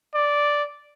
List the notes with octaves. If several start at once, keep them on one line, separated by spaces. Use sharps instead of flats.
D5